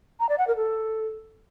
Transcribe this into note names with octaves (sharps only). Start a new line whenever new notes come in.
A#5
D5
F#5
A#4
A4